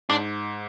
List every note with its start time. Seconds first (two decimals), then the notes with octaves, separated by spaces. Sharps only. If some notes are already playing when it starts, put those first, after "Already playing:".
0.10 G#2 D4